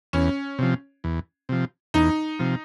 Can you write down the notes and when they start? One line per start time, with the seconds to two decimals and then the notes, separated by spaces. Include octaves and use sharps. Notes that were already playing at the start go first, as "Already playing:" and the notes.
0.13 E2 C#4
0.59 C3 F3
1.04 E2
1.49 C3 F3
1.94 E2 D#4
2.39 C3 F3